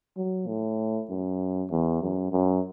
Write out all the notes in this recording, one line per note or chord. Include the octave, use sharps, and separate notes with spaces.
F#3
A2
F#2
E2
F#2
F#2